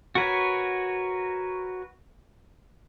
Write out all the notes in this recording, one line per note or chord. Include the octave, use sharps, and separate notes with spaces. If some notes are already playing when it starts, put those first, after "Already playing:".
F#4 A#4 B4 C#5